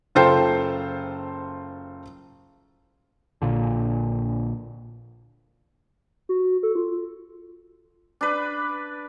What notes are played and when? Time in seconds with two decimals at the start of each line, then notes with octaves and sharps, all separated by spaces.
0.15 F#1 F4 A4 C5 G5 C7
3.42 A#1 A#2 D3
6.29 F#4
6.63 A4
6.75 F4
8.21 D4 B4